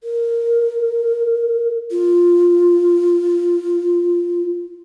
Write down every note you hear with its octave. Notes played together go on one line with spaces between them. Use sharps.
A#4
F4